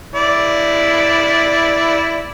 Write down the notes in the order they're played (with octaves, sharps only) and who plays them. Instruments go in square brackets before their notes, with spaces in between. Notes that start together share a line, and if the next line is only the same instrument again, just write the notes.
[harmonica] E4 D5